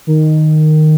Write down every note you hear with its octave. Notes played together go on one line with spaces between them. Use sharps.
D#3